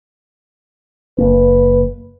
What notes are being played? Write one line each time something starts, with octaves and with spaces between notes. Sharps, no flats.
F#1 A#3 B4